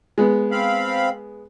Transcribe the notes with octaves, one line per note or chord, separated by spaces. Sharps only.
G#3 B3
C4 F5 B5